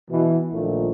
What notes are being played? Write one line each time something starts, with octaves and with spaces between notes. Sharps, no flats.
B2 E3
A#1 A#2 D#3 F3 A3